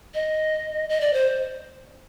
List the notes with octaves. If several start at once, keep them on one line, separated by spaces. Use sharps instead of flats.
D#5
D#5
D5
C5